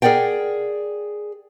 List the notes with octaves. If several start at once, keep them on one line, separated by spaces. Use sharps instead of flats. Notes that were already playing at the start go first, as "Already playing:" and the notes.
G#4 A#4 D5 F#5 G5